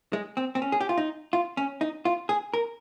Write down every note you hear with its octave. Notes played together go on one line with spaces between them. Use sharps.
G#3
C4
C4
C#4
G#4
G4
F4
D#4
F4
C#4
D#4
F4
G#4
A#4